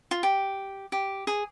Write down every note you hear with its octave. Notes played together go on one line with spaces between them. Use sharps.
F4
G4
G4
G#4